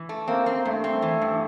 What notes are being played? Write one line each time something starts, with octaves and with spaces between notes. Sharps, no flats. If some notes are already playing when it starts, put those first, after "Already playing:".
Already playing: E3
A3
A#3 C4
C4
G2 A3
C4
E3
G2